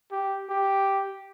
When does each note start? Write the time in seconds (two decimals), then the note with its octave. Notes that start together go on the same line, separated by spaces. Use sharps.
0.11 G4
0.49 G4